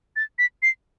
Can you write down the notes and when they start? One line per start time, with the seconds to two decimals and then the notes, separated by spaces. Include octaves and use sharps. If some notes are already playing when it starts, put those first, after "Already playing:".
0.16 A6
0.39 B6
0.62 C7